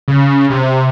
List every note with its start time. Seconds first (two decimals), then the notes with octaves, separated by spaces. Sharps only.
0.08 C#3
0.50 C3